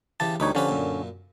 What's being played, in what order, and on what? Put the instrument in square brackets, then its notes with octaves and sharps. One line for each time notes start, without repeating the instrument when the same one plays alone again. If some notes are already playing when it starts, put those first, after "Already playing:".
[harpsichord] C#3 E3 G4 [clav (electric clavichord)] A5
[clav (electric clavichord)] D2 D#4 C#5 [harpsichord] G3 B4
[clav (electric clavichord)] D3 C#4 [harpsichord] F3 G4 B4
[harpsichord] F#2 A#2